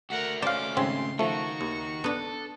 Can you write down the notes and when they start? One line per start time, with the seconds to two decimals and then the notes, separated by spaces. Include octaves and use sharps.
0.10 A3 F#4 A#4 F#5
0.42 C#4 C5 D5 F5 D6
0.77 G#1 C#3 C4 C6
1.19 D#3 F3 A3 F#4 C#6
1.61 D#2
2.04 B3 D4 A4